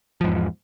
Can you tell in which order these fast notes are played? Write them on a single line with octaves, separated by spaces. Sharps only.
F3 G#2 E2